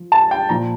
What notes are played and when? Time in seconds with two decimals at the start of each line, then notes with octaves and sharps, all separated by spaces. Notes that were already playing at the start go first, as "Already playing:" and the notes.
Already playing: F3
0.12 A5
0.31 G5
0.49 A#2 F3 A#5